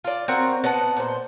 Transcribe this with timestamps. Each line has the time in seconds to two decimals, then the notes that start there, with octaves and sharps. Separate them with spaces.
0.04 F4 D5
0.28 C4 F#4 A#4
0.64 B3 D#5 F#5 A5
0.96 A#2 C5